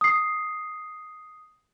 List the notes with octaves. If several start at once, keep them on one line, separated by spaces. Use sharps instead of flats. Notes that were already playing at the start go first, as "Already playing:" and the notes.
D#6 C7